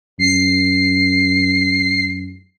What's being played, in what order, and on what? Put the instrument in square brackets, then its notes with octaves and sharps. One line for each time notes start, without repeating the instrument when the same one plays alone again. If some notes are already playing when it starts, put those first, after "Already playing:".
[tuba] F#2 [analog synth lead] C7